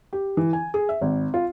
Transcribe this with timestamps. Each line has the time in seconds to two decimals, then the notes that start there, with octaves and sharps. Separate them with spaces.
0.13 G4
0.37 E3
0.53 G#5
0.74 G#4
0.89 E5
1.01 G#1
1.34 F4